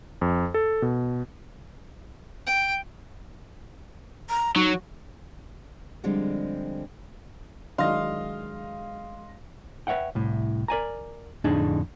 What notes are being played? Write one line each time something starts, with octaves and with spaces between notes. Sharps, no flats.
F2
A4
B2
G5
A#5
F#3 D#4 F#4
D3 F3 G3 G#3 C4
D#3 F#3 G#3 D4 D#5 F5 C6
B4 C#5 E5 F#5 G5
C2 A2
A#4 D5 G#5 A#5
F2 A2 D3 D4 D#4 G#4